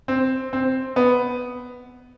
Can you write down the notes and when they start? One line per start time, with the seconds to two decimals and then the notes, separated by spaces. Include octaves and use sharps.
0.08 C4
0.53 C4
0.96 B3